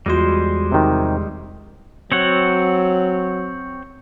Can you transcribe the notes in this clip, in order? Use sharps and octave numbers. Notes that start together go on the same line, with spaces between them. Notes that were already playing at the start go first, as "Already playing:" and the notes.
E2 G3 G#3 F4 F#4 C5 C6 A#6
C3 D#3
F#3 C4 C#5 F#5